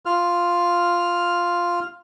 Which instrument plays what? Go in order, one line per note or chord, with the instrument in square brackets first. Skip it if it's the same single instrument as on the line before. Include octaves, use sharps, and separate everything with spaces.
[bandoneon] F4 F6